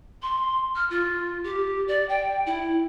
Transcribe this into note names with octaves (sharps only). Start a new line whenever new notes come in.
C6
F6
F4
G4
D5
G5
E4